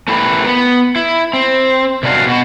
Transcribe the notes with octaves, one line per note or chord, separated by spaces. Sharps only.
A3 E4 G4 A#4 B4
B3
E4
C4
C3 D#3 G3 D4 F#4 F5
B2 F#4